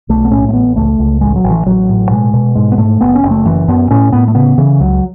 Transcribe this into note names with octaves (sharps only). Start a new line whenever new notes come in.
B1 A3
B3
A2 C#4
A3
A1 B3
C#2 A3
C#2
A1 G#3
F#3
A1
E3
A1 F#3
A2
B2 G#3
B2
G#2 G#3
B3
G#2 A3
F#1 B3
C#4
F#1
A3
F#2 E3
F#2 B3
A2 C#4
A2 B3
A3
C#3 B3
C#3 E3
C#2 F#3